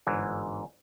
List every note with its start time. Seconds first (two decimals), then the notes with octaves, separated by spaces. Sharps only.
0.07 G1 G#2 E3